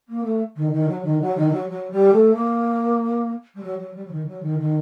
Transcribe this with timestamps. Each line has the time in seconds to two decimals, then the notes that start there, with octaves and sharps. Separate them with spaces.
0.08 A#3
0.23 A3
0.56 D#3
0.72 D#3
0.88 F#3
1.04 D#3
1.21 F#3
1.37 D#3
1.52 F#3
1.69 F#3
1.91 G3
2.12 A3
2.34 A#3
3.55 G3
3.62 F#3
3.78 F#3
3.94 G3
4.04 F#3
4.11 D#3
4.27 F#3
4.42 D#3
4.59 D#3